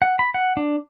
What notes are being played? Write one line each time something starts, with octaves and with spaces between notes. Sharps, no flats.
F#5
B5
F#5
D4